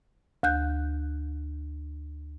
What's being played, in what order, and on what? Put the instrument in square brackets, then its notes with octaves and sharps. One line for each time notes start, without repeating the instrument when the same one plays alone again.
[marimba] D2 F#6 G6